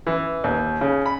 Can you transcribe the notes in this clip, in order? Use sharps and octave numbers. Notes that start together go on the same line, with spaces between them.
E3
D#2
C#3
B5